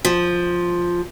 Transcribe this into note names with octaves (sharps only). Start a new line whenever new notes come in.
F3